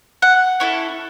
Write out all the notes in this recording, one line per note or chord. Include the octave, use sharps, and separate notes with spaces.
F#5
C#4 E4 A4